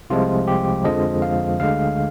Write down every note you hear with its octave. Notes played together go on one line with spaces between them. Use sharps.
C2 C3 F3 G#3 F4
G4
F2 D3 F3 G#3 D#5
F5
D2 D3 G#3 F5